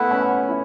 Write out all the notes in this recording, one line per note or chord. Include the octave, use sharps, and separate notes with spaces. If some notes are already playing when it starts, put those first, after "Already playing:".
Already playing: A3 B3 E4 B4 F#5
C#4
E4